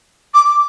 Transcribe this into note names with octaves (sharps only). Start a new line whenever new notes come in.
D6